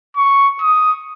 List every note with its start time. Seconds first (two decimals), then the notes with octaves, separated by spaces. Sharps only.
0.16 C#6
0.62 D#6